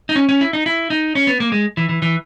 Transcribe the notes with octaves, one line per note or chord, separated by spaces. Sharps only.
D#4
C#4
C#4
E4
D#4
E4
D#4
C#4
B3
A#3
G#3
E3
E3
E3